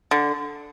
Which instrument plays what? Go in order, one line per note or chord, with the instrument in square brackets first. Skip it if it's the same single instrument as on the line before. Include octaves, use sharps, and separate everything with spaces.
[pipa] D3